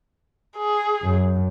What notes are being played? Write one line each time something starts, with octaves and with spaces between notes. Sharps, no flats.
G#4
F#2